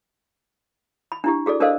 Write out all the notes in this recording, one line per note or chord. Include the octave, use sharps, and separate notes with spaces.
B5
D4 E4 G4
F#4 G#4 A4 D5
D4 A4 A#4 C5 D#5 F5